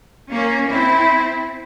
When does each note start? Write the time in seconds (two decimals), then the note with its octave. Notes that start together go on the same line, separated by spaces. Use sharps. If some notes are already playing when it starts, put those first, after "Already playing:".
0.31 A#3 C#4
0.69 C4 E4